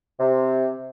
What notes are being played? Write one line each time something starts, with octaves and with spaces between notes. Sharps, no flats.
C3